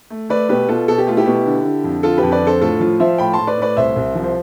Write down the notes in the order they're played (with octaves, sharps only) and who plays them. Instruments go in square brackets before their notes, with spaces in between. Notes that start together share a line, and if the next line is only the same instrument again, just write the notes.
[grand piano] A3
A3 B4 D5
B2 G4 B4
B2 F4 A4
B2 A4
G4
A3 F4
E4 G4
B2
D3
D3
F2
D3 F4 A4
G4 B4
F2
B4 D5
D3 A4 C5
A2 F4 A4
F3 F4
F3 C5 E5
A2 G5 B5
A5 C6
A2
B4 D5
A2 B4 D5
C2 C5 E5
C2
F3
C5